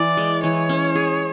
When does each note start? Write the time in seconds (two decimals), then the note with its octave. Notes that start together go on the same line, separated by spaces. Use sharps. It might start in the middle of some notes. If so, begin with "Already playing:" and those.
Already playing: E3 D5
0.17 G#3
0.43 E3 C#5
0.69 C#4
0.95 G#4